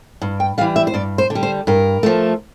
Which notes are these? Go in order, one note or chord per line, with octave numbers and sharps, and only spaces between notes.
G2
G5
E3 G3 F5
E5
C5
G2 D5
C5
D3
G3
C5
G2 A#4
F3 A3